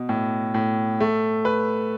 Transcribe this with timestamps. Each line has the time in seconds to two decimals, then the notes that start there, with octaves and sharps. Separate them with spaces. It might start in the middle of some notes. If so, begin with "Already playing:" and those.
Already playing: B2
0.09 A2
0.54 A2
1.00 A3
1.45 B4